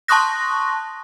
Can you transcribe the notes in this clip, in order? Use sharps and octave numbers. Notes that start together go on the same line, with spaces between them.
A5 C6 C#6 D#6 F#6 A#6